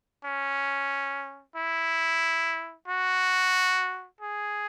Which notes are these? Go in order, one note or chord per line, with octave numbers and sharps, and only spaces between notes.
C#4
E4
F#4
G#4